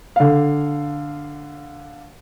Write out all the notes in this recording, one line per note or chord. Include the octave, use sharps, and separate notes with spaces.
D3 F5